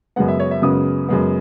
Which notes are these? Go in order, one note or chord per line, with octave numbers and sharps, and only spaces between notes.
F#2 C#3 G#3 B3 F#5
E5
C#5
E5
F#2 C#3 G#3 B3 D#6
F#2 C#3 G#3 B3